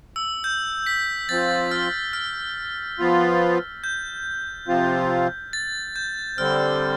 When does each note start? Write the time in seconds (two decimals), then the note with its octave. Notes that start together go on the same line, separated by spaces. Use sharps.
0.16 E6
0.44 G6
0.86 B6
1.29 F3 C4 F4 A6
1.71 F6
2.13 F6
2.99 F3 B3 F4
3.84 G6
4.68 C3 F3 C4 F4
5.53 A6
5.96 G6
6.38 D3 G3 C4 F6